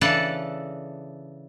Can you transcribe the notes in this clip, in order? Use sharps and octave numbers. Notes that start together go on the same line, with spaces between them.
C#3 E3 D4 A4 F#5 A5